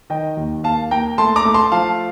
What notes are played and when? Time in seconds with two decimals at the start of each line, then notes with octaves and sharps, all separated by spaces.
0.10 D#3 D#5 G5
0.37 D#2
0.64 A#3 F5 A5
0.91 A#3 G5 A#5
1.18 A3 A5 C6
1.36 A#5 D6
1.45 A3
1.54 A5 C6
1.72 F3 F5 A5